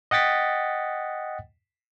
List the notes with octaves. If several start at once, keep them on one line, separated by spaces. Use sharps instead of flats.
D#5 F#5 G5 A6 B6